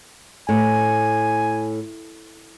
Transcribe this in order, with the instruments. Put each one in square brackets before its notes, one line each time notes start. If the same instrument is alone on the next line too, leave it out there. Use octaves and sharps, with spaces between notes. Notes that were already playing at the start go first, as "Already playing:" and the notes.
[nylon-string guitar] A2 [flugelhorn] G#5